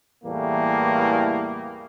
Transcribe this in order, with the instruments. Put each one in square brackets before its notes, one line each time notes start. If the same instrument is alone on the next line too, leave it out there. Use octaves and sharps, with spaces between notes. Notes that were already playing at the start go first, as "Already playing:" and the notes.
[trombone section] E2 A2 E3 G3 A3 A#3